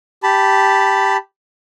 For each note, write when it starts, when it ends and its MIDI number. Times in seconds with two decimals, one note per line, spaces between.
0.23 1.17 67
0.23 1.17 81
0.23 1.17 83